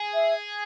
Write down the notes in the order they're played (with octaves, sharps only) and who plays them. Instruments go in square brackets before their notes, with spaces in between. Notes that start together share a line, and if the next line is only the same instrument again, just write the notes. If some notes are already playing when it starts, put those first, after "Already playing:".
Already playing: [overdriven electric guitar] G#4
[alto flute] E5